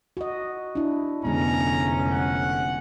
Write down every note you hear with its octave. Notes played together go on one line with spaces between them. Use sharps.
F#4 D#5
D4 E4
F1 D3 G#3 B3 C#4 A#5
F#5